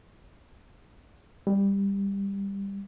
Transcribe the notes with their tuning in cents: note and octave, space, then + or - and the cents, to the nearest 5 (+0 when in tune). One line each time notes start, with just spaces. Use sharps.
G3 +15